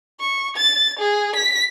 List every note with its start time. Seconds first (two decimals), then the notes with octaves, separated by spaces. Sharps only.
0.20 C#6
0.56 A6
0.99 G#4
1.36 B6